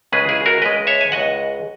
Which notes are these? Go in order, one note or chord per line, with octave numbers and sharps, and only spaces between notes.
C#2 C#3 G#3 G#4 B4
E4 G#4
F#4 A#4
C#2 C#3 G#3 B4 D#5
C#5 E5
G#5
C#2 C#3 G#3 D#5 F#5